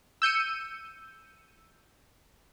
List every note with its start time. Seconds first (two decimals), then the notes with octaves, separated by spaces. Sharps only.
0.22 E6 G6 C#7 D#7